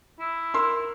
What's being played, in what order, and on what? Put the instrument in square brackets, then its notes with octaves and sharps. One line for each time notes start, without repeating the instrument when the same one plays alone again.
[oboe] E4
[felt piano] A#4 C6 E6